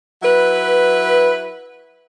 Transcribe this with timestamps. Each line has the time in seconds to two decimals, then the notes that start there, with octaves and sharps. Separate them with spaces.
0.23 F#3 E4 B4